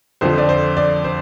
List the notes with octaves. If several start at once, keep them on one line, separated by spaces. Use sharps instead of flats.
F2 D3 F3 C5
D5
C5
D5
C5